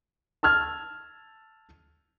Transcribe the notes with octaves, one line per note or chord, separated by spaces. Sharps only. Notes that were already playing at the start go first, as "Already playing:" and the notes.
A5 E6 F6 G#6